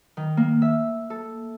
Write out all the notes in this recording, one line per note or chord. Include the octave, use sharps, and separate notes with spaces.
D#3
A#3
E5
A4